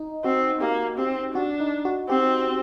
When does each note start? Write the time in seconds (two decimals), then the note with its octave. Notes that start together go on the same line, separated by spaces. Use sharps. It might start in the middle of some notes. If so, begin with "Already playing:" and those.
Already playing: D#4
0.24 C4 F#4
0.61 A#3 G4
0.98 C4 G4
1.35 D4 F#4
1.60 D#4
1.85 F#4
2.09 C4 G4